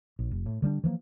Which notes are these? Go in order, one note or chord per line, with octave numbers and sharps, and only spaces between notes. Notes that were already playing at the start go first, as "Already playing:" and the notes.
A#1
F1
A2
D3 G3 C4 D4
E3 F3 A3 A#3